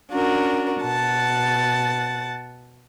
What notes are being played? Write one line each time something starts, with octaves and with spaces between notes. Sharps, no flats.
C#4 D4 F#4 A#4
B2 F#5 A5 A6